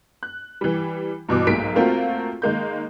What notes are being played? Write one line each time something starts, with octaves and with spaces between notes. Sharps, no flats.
F#6
E3 G3
G2 B2 E3 D6
B1 G#2 A#3 B6 D7
A3 A#3 C4 F4 F#4 A#4
D#3 G#3 A#3 G6